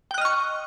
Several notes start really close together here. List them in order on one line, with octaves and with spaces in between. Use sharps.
G5 F#6 D#5 F6 C#6